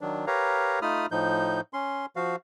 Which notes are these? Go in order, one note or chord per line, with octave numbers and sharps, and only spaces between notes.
D#3 F#3 D4
G4 A#4 B4 C#5 F5 A#5
A3 D#4 F4 B5 D#6 F6
A2 F3 D#4 G6
C#4 C6
F3 F#4 F5